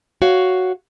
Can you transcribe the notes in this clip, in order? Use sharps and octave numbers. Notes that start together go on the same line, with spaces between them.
F#4 C#5 F5